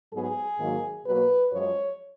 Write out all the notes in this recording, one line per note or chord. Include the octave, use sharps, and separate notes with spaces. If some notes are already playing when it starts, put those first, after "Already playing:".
G#2 F#3 B3 G#4
G#2 D#3 F#3 A#3
B2 F#3 A#3 B4
F#2 F3 G#3 C#5